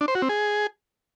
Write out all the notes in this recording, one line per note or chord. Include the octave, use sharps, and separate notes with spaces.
D4
C5
F#4
C4
G#4